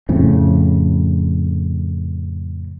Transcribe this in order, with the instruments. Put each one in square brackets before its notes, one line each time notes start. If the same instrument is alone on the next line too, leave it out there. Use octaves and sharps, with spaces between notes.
[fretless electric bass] F2 A2 C#3